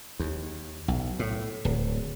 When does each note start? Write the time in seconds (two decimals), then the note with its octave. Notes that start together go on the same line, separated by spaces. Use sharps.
0.19 D#2
0.88 B1
1.19 A2
1.65 D1